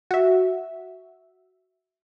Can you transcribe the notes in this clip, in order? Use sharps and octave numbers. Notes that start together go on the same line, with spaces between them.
F#4 E5